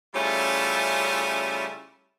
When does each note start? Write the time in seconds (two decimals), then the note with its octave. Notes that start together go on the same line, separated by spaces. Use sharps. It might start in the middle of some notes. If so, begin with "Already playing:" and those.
0.15 C#3 G3 A3 C#4 E4 F4